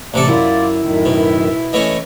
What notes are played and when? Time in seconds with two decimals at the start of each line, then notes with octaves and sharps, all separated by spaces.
0.14 A1 C3 D4 A4 D5
0.28 F#2 E4 F4 D5
0.82 F#2 A2 D#3
1.05 B2
1.73 E3 A3 C#4 D#5